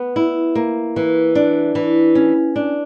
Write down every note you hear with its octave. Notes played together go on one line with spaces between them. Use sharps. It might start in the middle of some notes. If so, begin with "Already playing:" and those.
Already playing: B3
E4
A#3
E3
D4
E3
C#4
D4